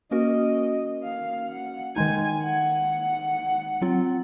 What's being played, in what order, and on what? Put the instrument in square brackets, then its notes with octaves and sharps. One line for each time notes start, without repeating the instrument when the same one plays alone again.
[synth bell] A#3 C#4 F#4 A#4 [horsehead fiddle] D#5
[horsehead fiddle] F5
F#5
[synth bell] D#3 G#3 D#4 [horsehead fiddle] G#5
[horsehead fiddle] F#5
[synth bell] F#3 C4 F4